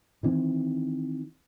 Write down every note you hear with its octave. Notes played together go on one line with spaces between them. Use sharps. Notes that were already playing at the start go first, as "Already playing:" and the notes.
D#3 E3 C4